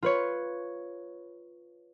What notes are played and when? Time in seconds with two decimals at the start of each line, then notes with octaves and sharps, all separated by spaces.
0.03 F4 B4 C#5